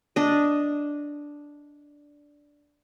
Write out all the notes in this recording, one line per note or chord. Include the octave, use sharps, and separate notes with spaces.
D4 D#5